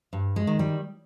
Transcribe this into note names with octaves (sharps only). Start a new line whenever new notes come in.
G2
G#3
D#3
G3